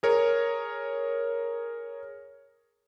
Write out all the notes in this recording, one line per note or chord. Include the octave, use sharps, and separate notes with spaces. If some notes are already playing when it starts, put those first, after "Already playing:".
G#4 A#4 C#5